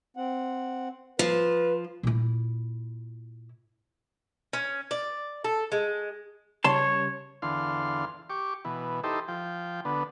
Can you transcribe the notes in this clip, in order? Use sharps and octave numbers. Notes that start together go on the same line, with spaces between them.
C4 F#5
F3 B4
A#2 E4
C#4
D5
A4
G#3
C#3 G3 C#5 A5 C6
E2 D3 F5 C6
G4 C#6 D6
B2 E3
D#4 E4 G4 A4 C5
F3 G5
D3 B3